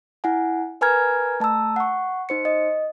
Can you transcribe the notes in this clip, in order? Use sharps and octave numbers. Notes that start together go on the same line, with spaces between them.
E4 F#5 G#5
A#4 B4 G#5 A#5 F6 G#6
A3 A5 A#5 E6
F#5 C#6
D#4 C5 C#7
D#5